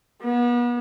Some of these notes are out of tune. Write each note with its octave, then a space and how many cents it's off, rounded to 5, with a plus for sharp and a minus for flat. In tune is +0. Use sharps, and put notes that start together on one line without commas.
B3 -35